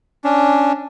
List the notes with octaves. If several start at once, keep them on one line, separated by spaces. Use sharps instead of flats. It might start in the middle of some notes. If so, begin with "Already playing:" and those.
C#4 D4